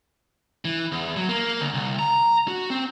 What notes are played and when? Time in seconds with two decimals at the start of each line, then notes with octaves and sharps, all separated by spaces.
0.65 E3
0.92 E2
1.17 F#3
1.29 A#3
1.61 D2
1.74 C2
1.99 A#5
2.48 F#4
2.70 C4